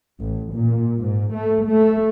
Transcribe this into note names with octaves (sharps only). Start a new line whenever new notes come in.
A1
A#2
G#2
A3
A3